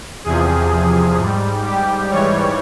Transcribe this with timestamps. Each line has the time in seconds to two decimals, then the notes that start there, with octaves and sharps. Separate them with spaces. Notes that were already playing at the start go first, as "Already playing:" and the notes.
0.24 E2 C3 F3 G#4
1.17 G#2 G3
1.65 G4
2.10 G#2 E3 G3 C#5